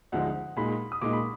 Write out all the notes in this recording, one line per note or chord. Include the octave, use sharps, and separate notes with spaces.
D2 D3 F3 G#3 D#4 F#5
A#2 G#3 D#4 B5
D#6
A#2 G#3 D#4 D6
B5